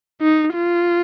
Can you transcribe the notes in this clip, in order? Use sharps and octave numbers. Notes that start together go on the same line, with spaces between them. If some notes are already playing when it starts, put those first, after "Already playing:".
D#4
F4